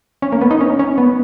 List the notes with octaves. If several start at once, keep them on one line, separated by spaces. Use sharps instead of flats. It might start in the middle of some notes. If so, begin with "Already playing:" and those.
C#4
A#3
B3
D#4
C#4
C#4
B3